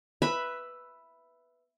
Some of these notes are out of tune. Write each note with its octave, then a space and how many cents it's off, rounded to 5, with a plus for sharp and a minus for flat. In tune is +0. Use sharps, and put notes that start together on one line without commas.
B4 +0 E5 +5 B5 +0